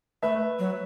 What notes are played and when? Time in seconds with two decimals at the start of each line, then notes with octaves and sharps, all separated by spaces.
0.23 A3 B4 E5
0.59 F#3